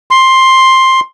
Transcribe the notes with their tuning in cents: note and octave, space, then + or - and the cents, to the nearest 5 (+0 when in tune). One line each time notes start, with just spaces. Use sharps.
C6 +10